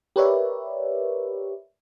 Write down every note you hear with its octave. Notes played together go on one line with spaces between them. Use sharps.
G4 A#4 B4 C#5 D5 E5